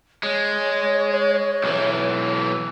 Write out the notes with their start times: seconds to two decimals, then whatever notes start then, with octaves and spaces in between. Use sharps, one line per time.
0.23 G#3 C#5
1.64 B1 E3